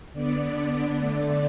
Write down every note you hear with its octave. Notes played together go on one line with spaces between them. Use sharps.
D3 B3 D5
D5
D3 A3 D5